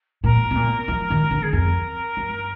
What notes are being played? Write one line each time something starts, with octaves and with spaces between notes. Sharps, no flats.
A#2 A#4
C3
A#2
F3
D#3
D3
G#4
F2 A#4
G2